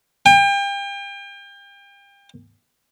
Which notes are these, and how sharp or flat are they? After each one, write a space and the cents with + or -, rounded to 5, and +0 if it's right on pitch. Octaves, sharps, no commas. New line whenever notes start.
G5 +35